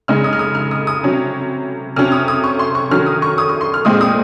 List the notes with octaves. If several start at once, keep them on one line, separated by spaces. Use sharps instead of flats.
C#3 G#3 D#4 F6
D#6
F6
D#6
F6
D#6
D#6
C3 F#3 C#4
C3 F#3 C#4 F6
D#6
D#6
C#6
C6
C#6
D#3 F#3 C#4 F6
D#6
C#6
D#6
C#6
C6
F6
A#2 G#3 C4 D#6
D#6